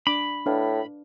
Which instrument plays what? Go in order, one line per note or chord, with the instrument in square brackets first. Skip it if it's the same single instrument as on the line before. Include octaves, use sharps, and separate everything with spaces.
[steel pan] D4 D6 [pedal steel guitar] B5
[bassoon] A2 [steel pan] D4 B4 F5